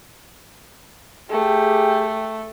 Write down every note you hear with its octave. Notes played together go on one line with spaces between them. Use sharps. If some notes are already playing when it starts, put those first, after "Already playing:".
A3 G4 G#4